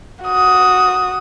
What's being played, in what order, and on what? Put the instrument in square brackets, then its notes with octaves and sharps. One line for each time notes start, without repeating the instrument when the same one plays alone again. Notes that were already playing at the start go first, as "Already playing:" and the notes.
[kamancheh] F#4 D#6